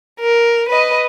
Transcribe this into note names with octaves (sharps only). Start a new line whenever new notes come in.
A#4
B4 D#5